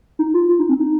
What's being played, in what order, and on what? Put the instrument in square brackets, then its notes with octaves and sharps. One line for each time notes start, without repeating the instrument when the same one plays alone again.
[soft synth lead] D#4
F4
F4
D#4
C4
D#4